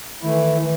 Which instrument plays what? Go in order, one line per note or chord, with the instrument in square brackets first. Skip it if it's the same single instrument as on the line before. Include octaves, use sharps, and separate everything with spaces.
[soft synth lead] D#3 [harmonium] E3 A3 E4
[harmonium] E3